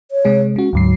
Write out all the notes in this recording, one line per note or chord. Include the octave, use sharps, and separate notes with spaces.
C#5
C3 G#3 G#4
G#3 C#4 F#4
D2 G#2 F#3 C7